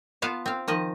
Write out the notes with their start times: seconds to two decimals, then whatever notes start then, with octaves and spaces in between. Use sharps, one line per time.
0.22 B3 F4 F5 A5
0.46 C4 F5
0.68 D#3 F3 D#5